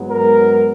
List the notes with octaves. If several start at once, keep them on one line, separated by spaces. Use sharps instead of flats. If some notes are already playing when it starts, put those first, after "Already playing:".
Already playing: G#2 F#3 B3
A#4